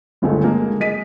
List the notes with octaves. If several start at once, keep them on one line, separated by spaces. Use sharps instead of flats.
G1 C#2 D3 G#3 A3
G#3 A#3
G#3 D#5 B6 D#7